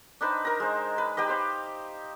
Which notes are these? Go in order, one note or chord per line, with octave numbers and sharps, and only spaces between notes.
D4 D#4 B4 C5
A#4 A#5
G#3 C5
B4
D#4 G4 B4 D#5
C5 F5